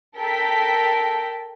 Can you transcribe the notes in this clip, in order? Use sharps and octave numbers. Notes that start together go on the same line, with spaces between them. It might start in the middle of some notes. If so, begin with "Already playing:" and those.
A4 A#4 G5 B6